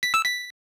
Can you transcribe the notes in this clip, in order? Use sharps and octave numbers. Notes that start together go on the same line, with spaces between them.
B6
E6
B6